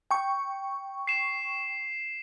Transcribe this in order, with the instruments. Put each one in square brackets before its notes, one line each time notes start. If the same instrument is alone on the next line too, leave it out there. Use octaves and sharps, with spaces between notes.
[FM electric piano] G5 C#6
[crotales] C7 E7